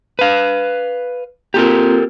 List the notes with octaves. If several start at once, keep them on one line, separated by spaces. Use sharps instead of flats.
B4 F5
A#3 C4 F4 G4 A4 A#4